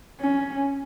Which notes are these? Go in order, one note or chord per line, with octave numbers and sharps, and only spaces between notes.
C#4